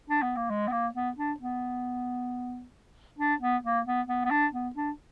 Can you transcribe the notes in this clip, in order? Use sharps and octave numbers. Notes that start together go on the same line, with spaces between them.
D4
B3
A#3
G#3
B3
A#3
B3
D4
B3
D4
B3
A#3
B3
B3
B3
D4
B3
D4